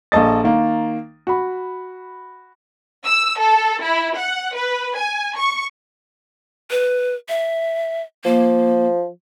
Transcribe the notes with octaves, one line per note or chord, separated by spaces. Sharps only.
A#1 A#3 A4 D#5 A6
D#3 A#3
F#4 B5
E6
A4
E4
F#5
B4
G#5
C#6
B4
E5
F3 A#3